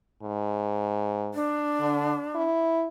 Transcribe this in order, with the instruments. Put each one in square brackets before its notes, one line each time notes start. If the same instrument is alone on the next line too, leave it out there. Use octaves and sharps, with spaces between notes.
[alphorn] G#2
[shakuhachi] D4
[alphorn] D3
E4